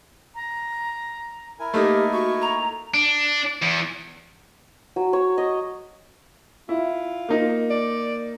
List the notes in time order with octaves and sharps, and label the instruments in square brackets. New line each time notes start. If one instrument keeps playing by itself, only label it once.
[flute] A#5
[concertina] E4 A#4 G#5
[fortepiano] A3 A#3 D#4 [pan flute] G4
[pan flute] F#4 [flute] C#6
[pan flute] A#5
[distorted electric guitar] D4
E2
[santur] F#3
C#5
D#5
[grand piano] E4 [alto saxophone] F4
[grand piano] A#3 D#4
[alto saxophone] D5